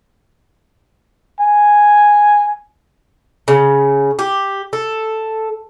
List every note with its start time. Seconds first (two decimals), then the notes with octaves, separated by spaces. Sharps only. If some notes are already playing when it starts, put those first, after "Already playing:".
1.41 G#5
3.48 C#3
4.19 G4
4.73 A4